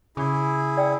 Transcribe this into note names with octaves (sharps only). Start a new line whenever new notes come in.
C#3 E4 G#4 D6
D5 G5 E6